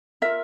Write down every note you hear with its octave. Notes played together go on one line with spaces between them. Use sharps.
F4 A#4 E5